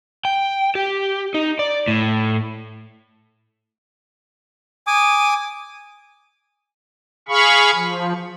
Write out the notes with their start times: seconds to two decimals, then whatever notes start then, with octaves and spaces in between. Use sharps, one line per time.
0.25 G5
0.75 G4
1.34 D#4
1.59 D5
1.88 A2
4.87 G#5 D6 D#6
7.29 G#4 F5 B5 C#6
7.75 F3